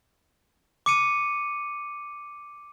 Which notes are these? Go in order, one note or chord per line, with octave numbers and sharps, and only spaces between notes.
D6 C#7 D#7